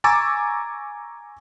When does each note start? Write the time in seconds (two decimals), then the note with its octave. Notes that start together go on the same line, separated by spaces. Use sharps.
0.04 G#5 A#5 C#6 D6 E6 A6